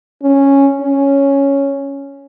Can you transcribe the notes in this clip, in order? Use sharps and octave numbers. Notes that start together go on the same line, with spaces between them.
C#4
C#4